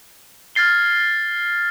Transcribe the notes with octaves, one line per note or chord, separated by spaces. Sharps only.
F6 G#6 A6 C7 G7